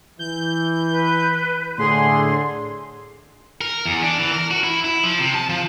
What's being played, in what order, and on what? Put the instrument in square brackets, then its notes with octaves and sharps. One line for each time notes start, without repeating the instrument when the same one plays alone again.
[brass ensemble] E3 [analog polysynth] G6
[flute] B4
[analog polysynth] A2 G#4 [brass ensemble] D3 [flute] C6
[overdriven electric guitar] A#4
E2
D4
E3
A#4
F#4
E4
E4
F3
C3
A5
F3